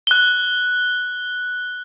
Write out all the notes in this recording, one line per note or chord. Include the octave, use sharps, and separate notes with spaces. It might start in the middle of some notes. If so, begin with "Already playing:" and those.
F#6 G7